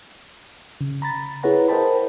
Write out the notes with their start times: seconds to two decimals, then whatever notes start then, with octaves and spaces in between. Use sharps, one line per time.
0.81 C#3
1.02 A#5 B5 A6
1.43 E4 G#4 B4 C#5 F#5 A#5
1.68 A#4 C5 D#5 G5 A5 B5